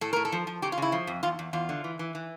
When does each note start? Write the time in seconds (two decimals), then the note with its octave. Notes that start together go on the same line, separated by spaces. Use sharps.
0.01 A2 A4
0.13 A2 A#4
0.25 A4
0.32 F3
0.47 F3
0.62 C#3 G4
0.72 F4
0.78 C#3 E4
0.92 F3
1.07 F2
1.23 E2 F4
1.39 E2
1.53 E2 F4
1.69 D3
1.84 E3
1.99 E3
2.15 E3